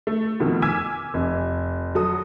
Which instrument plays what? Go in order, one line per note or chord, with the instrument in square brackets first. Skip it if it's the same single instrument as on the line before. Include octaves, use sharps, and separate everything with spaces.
[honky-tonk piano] A3
F2 B2 D#3 F3 A3 B3
G#5 D6 E6 F6 G#6 B6
F1
F#3 A4 D#6